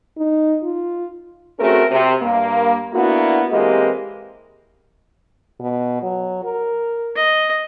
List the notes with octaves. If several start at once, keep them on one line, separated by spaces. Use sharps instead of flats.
D#4
F4
A3 C4 C#4 F#4 G#4 A#4
C3
G2 A#3
A#3 B3 D4 E4 F#4
E3 G#3 A#3 C4 G4 D#5
B2
F#3
A#4
D#5